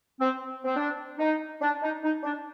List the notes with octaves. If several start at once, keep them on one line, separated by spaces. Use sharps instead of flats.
C4
C4
D4
D#4
D4
D#4
D#4
D4